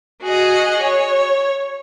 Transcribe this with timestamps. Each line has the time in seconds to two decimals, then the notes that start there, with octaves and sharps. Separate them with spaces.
0.22 F#4 G#4 D#5
0.81 C#5